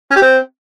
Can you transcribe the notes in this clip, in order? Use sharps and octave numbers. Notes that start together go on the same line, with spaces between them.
C#4
G4
C4